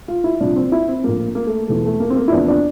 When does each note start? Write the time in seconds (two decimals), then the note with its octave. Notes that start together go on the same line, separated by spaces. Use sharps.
0.08 F4
0.24 E4
0.40 C2 A#2 F3 D4
0.56 C4
0.72 E4
0.88 C4
1.04 A#1 A2 F3 A#3
1.35 A#3
1.47 A3
1.68 E1 E2 E3 A3
1.85 A3
2.00 A#3
2.10 C4
2.16 A#3
2.28 E4
2.32 E2 C3 F3 D4
2.48 D4